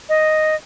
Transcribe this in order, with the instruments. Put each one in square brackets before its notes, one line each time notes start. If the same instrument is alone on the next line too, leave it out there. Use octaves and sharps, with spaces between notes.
[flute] D#5